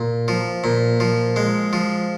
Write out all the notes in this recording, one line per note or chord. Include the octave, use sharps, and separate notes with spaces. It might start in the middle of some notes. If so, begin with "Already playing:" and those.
Already playing: A#2
F3
A#2
F3
G#3
F3